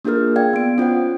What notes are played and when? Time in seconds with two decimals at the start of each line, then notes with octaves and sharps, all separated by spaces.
0.05 A#3 D4 F4 G#4 A#4 F6
0.36 D5 F5 G5 G#6
0.53 B3 D7
0.78 C#4 F4 C5 F#5